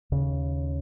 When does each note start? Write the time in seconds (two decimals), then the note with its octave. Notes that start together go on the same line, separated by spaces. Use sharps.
0.12 D#2 C#3